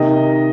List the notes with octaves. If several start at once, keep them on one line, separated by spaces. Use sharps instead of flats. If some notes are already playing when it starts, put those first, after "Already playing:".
Already playing: C3 D#3 A#3 D#5